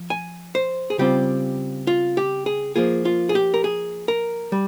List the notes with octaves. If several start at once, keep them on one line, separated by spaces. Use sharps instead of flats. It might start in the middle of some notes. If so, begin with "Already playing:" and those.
Already playing: F3
G#5
C5
G#4
C#3 G3 C4 F4 G4
F4
G4
G#4
F3 A#3 F4 G#4
F4
G#4
G4
A#4
G#4
A#4
G3